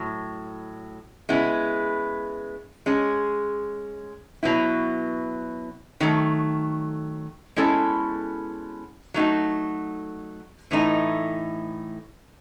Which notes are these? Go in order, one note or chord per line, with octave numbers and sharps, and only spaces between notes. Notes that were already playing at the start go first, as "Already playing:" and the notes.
Already playing: A2 F#3
C#3 G#3 B3 E4
G#3 C#4 G#4
B2 F#3 B3 E4
D#3 F#3 A3
B2 G#3 C#4 E4 A4
F#3 A3 D#4 F#4
A2 E3 A3 D#4